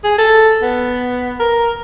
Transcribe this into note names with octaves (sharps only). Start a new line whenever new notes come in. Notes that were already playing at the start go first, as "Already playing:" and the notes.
G#4
A4
B3
A#4